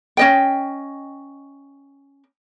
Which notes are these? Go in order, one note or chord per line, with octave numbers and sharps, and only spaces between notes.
C#4 D#5 G5